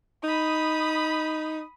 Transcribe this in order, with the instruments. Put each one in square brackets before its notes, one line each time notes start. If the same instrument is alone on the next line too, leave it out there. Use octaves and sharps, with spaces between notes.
[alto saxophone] D#4 [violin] B5 D#6